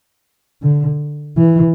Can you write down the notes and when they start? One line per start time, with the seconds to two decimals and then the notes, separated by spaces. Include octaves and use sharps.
0.62 D3
1.37 E3